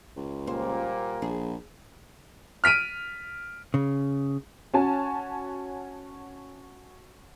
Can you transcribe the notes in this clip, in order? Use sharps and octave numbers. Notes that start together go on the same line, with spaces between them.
C#2
A#2 G3 A#3 C5
A#1 G#4
F6 B6 D7 D#7
C#3
C#4 F#4 C#5 G#5 A5